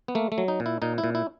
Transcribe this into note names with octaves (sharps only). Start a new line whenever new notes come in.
B3
A3 A#3
A3
F#3
D#4
A#2
E4
A#2 D#4
E4
A#2
E4